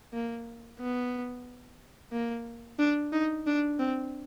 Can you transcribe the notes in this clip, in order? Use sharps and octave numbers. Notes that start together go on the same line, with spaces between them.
A#3
B3
A#3
D4
D#4
D4
C4